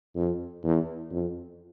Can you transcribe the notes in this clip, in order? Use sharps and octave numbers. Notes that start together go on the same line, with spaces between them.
F2
E2
F2